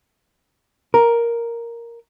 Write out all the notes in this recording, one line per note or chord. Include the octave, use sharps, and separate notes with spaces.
A#4